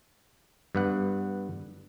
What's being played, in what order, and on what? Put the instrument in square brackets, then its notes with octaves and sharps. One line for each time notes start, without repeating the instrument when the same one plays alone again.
[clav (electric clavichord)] G2 B3 F#5